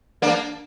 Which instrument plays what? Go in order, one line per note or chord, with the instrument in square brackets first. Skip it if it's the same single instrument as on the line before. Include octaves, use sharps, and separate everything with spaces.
[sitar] A#3 D4